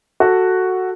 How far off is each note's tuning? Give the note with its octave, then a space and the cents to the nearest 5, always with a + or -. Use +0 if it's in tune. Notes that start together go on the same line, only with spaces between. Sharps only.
F#4 +0 A4 +10